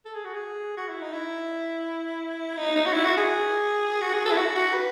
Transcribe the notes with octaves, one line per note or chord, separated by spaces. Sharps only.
A4
G#4
F#4
G#4
F#4
E4
D#4
E4
D#4
D#4
F#4
E4
F#4
G#4
F#4
G#4
A4
E4
F#4
F#4
B4